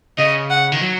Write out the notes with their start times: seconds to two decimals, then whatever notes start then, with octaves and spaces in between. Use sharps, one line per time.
0.18 C#3 D#5
0.50 F#5
0.72 D#3
0.81 F#3